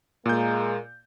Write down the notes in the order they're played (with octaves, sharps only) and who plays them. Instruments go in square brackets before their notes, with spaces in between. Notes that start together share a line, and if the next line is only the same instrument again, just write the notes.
[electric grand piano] A#2 G6 [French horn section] G#3 A#3